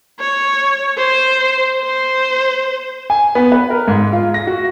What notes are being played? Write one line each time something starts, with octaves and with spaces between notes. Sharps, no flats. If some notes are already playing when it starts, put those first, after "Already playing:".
C#5
C5
C5
G#5
B3
B4
A#4
G#2
F4
A#6
F#4